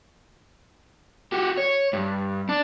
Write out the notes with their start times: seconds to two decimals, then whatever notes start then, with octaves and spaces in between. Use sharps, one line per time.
1.32 F#4 G4
1.57 C#5
1.93 G2
2.49 D4